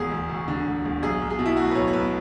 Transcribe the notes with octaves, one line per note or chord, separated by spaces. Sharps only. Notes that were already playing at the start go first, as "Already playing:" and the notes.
Already playing: E1 E2 G#4
E1
D2
D3
E1
E1
B1 G#4
B1
G#4
B2
E4
A3 F#4
B4
B1 C#5
C#5
B1 B4